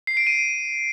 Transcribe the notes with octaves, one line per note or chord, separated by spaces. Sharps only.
C7
D7
D#7